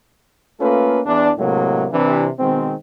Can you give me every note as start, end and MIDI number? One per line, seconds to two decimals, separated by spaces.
0.60 1.00 57
0.60 1.00 58
0.60 1.00 61
0.60 1.00 65
0.60 1.00 69
0.60 1.00 71
1.06 1.30 40
1.06 1.30 62
1.37 1.86 45
1.37 1.86 48
1.37 1.86 54
1.37 1.86 56
1.37 1.86 58
1.92 2.28 48
1.92 2.28 52
1.92 2.28 62
2.39 2.74 47
2.39 2.74 51
2.39 2.74 56
2.39 2.74 60